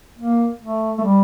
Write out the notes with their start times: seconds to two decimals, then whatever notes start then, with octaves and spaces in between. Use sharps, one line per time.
0.19 A#3
0.62 A3
0.98 A3
1.04 G3